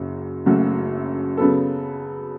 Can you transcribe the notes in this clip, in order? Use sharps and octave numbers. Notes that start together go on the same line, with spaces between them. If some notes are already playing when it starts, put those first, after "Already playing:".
Already playing: F#1 F#2 C#3 F#4
F#1 F#2 C#3 A3 F#4
C#3 F#3 B3 A4